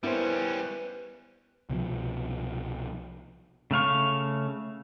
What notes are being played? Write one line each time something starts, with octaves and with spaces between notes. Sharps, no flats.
G3 A#3 B3 C#4 E4 B4 C5
C2 B2 E3 F3
C#3 A3 F5 C#6